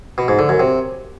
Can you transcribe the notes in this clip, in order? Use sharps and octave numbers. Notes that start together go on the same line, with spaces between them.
B2
G#2
D3
F#2
C3